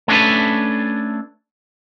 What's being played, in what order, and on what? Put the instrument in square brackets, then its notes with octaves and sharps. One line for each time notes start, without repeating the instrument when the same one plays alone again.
[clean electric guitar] A3 C#4 D4 F#4 A4 B4